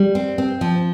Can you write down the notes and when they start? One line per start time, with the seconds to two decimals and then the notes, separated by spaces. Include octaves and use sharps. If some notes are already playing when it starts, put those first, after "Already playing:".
Already playing: G3
0.15 C4
0.38 C4
0.61 F3